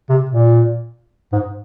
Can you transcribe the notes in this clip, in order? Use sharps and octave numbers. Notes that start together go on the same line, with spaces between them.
C3
A#2
G#2